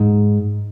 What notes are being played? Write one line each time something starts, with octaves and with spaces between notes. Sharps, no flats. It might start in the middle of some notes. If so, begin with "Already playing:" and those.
Already playing: G#2